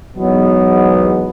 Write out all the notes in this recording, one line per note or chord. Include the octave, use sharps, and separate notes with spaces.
E2 G#2 B2 F#3 B3